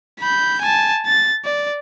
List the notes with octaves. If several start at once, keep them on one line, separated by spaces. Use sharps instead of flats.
B5 G6
G#5 A5
A6
D5